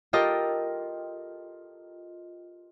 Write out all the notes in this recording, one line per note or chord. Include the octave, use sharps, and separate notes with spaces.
F4 G4 A4 A#4 D#5